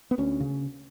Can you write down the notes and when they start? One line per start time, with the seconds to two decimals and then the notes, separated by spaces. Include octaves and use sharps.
0.11 B3
0.18 D2 C#4
0.40 C#3